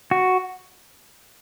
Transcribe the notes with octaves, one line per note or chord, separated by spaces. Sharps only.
F#4